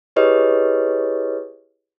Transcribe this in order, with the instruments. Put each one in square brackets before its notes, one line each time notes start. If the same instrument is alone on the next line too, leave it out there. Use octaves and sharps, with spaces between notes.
[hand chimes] E4 G4 G#4 B4 C#5 D#5